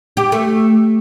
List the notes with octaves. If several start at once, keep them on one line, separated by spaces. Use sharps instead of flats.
G4
A3